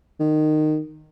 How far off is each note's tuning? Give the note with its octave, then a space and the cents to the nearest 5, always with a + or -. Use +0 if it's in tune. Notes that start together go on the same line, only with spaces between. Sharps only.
D#3 -20